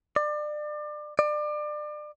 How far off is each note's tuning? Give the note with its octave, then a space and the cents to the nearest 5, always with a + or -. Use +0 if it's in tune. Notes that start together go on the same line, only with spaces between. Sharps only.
D5 +30
D5 +30